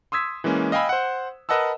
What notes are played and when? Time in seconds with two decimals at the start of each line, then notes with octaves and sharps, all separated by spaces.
0.12 C6 D#6 E6 G#6 B6
0.44 E3 G#3 A#3 C#4
0.72 D#5 F5 G5 G#5 B5 E6
0.89 C5 F#5
1.49 A#4 B4 D#5 F#5 A5 E6